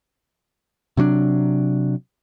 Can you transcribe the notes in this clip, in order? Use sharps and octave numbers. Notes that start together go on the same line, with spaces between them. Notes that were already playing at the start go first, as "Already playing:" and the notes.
C3 F#3 C#4 D4